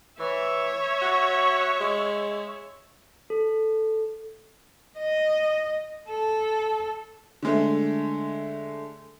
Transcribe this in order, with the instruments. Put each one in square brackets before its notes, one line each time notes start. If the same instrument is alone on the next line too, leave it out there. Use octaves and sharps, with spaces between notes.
[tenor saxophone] E3 [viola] C#5 E5
[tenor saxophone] F#4
G#3
[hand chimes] A4
[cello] D#5
A4
[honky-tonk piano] D3 G#3 A3